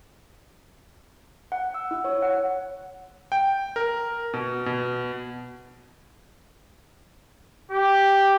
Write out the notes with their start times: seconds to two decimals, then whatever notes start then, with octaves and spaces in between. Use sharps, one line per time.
1.52 F#5
1.74 E6
1.91 E4
2.05 C#5
2.22 F#5
3.32 G5
3.76 A#4
4.34 B2
4.66 B2
7.71 G4